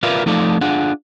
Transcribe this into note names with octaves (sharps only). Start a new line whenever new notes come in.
F4 A#4 B4 D5 E5 F5
F3 A3 D#4 F4 A4 D5
D4 F4 G#4 F#5